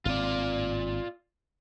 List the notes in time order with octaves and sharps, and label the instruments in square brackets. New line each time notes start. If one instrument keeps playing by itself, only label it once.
[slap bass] G#1 C4 [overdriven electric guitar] F4 D5